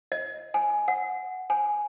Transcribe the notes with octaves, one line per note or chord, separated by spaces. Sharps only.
D#5
G#5
F#5
G#5